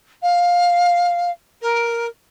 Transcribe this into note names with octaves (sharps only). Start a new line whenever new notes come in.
F5
A#4